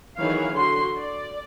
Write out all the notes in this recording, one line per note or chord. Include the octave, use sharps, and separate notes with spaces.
D#3 E3 F#3 G#4 C#5 F5
D3 F#4 C6
D5